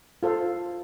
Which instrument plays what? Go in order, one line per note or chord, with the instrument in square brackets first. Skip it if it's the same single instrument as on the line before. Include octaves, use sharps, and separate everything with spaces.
[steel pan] F4 A4 C5 F5